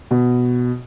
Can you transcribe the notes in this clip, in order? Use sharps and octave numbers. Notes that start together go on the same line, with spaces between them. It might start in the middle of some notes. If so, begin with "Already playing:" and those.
B2